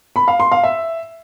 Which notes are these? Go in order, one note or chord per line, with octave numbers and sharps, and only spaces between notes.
B5
F5
C6
F5
E5